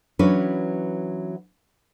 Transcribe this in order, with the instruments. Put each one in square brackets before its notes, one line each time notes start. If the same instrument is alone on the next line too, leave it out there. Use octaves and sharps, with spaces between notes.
[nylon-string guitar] E3 F#3 C#4 D4 B4